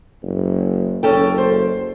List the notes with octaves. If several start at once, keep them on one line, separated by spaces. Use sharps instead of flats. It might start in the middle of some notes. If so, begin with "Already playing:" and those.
F#1
F#1 C#4 A4 G5
C5